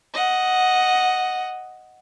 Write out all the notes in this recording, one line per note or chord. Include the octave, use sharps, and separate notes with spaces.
D#5 F#5